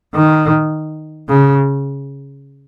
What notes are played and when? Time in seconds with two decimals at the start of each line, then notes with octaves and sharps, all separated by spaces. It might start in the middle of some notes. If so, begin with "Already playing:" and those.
0.15 D#3
1.29 C#3